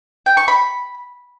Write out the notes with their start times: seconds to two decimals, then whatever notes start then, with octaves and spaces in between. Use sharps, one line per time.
0.26 G5
0.37 C#6
0.48 B5